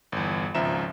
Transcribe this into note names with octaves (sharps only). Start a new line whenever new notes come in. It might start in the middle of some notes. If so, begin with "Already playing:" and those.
G1 E2
G#1 C#2 F3 E5 A#5 E7